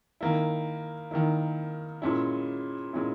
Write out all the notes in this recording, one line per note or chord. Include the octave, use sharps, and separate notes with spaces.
D#3 A#3 E4
D#3 A#3 E4
A#2 G#3 C#4 E4
A#2 G#3 C#4 E4